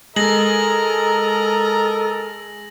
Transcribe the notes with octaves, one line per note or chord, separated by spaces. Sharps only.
G#3 A4 A#4 D#5 A#5 A#6 F#7